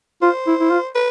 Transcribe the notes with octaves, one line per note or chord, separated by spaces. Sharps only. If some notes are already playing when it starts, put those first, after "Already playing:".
F4 C5
E4
E4
F4
B4